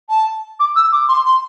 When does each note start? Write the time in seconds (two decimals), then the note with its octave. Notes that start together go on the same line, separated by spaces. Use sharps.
0.09 A5
0.59 D6
0.75 E6
0.92 D6
1.08 C6
1.25 C6